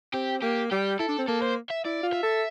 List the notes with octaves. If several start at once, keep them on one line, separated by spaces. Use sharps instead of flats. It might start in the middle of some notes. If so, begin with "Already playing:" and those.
C4 G4
A#3 G4
G3 G4
E4 A4
D4
C4
A#3 A4
C5
E5
E4 D5
F4
E5
A4